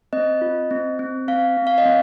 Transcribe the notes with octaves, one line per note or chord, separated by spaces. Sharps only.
C4 D#5
F4
C4
C4
C4 F5
C4
F5
D#5
C4